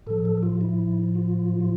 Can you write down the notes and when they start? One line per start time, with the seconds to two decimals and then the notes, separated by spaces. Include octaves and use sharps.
0.06 A2 F3 A4
0.25 A4
0.43 F4
0.61 E4
1.15 F4
1.60 F4